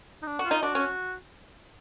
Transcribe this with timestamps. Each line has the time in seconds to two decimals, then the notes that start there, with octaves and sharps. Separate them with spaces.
0.22 D#4
0.27 D4
0.39 F#4
0.45 F4
0.51 D#4
0.63 D4 F#4
0.75 C#4